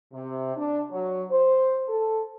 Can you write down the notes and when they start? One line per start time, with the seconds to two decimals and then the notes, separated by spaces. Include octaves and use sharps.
0.12 C3
0.56 D4
0.91 F#3
1.30 C5
1.88 A4